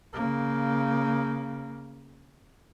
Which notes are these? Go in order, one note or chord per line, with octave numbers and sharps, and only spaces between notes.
C#3 A#3